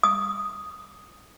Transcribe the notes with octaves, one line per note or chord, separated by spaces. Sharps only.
D#6